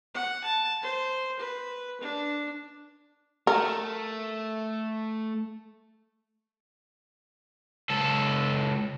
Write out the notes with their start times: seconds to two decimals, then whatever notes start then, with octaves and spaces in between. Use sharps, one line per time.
0.14 F#5
0.44 A5
0.82 C5
1.39 B4
2.01 D4
3.47 A3 A#4
7.90 C#2 A4